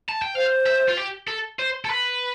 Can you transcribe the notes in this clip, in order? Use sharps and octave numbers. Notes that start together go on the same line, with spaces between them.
A5
G5
C5 F5
E5
F4
G4
A4
C5
A4
B4